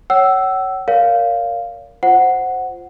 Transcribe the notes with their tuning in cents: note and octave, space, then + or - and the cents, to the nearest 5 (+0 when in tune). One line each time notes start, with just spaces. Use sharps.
C#5 +0 F#5 +40 E6 +0
A#4 +0 C#5 +35 F5 +0
F4 +0 C5 +0 F#5 +0